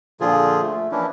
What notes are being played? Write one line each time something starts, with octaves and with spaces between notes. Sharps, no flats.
A#2 D3 F3 F4 G#4
A3
E3 F3 A#3 C#4 D4 E4